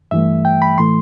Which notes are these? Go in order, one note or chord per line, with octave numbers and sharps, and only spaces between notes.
G2 E3 A3 E5
G5
B5
A2 E3 A3 C6